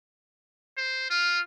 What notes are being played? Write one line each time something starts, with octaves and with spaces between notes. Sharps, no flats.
C5
F4 F6